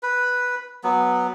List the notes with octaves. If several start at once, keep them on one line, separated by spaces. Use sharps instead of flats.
B4
F#3 B3